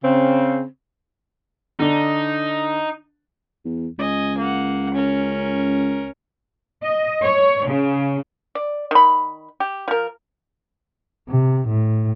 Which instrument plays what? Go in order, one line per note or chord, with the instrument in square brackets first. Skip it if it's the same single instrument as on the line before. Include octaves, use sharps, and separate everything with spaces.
[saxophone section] C#3 C4
[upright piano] D3 D4 [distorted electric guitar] D#4
[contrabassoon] E2
[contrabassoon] C#2 [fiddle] D#5 G#5
[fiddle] A#3 F#5
C#4 A#4
[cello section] D#5
C#5
C#3
[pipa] D5
D#3 B5
G4
F3 A#4
[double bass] C3
A2